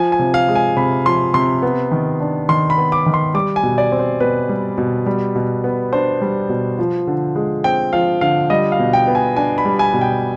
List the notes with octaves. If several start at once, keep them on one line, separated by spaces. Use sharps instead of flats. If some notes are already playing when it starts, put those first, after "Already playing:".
Already playing: F3 G#5
G#5
C3
F5
G#3
G#5
C3 B5
F3 C6
C3 C6
B3
D#3
D4
D#3 C6
B5
B3
D6
D#3
C6
G3 D6
G#5
B2
D5
C4
C5
B2 B4
G3
B2
G3
B2
B3
D4 C5
G3
B2
F3
D3
G#3
C4 G5
F3 F5
D3 F5
G3 D#5
F5
B2
G5
B3
G#5
D4 G#5
B5
G3
G#5
B2
G5